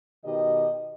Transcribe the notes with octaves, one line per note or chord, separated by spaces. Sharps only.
B2 D#3 G4 D#5